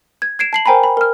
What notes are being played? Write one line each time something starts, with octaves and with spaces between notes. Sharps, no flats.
G#6
G#6 C7 D7 E7
A5 C7 F#7
A#4 C5 G5 G#5 A#5 B5
B5
A#4 F6